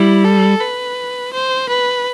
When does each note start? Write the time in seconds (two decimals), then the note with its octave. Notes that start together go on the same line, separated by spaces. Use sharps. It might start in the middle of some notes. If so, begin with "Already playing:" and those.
Already playing: G3 E4
0.25 A4
0.61 B4
1.33 C5
1.69 B4